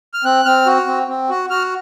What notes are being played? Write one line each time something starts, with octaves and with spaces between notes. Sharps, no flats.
F6
C4 F#6
C4 F6
F#4
C4
C4
F#4
F#4 F6